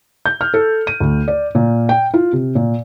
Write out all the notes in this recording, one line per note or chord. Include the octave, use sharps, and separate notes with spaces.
G6
F6
A4
D#7
D2
D5
A#2
G5
F4
C3
A#2